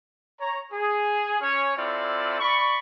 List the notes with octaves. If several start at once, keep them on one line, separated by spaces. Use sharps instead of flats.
C#5 A#5
G#4
C#4 C#5
C4 E4 F4 A4 D5
D5 B5 C#6